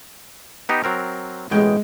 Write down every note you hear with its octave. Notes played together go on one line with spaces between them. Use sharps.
B3 D#4 G4
F#3 C4 A#4
A1 B2 G#3 G5